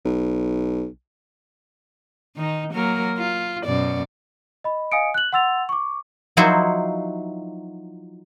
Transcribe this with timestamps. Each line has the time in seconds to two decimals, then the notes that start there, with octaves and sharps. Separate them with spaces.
0.05 B1
2.36 D#3 D#4
2.73 F#3 A#3 A#4
3.17 F4
3.64 F#2 B2 D5
4.64 D#5 B5
4.92 D#5 F5 G#5 D#6 C#7 D7
5.14 F#6 F#7
5.33 F#5 C6 E6 A6 F7
5.69 C#6 D6
6.37 F3 F#3 D#4 E4 F#4 C5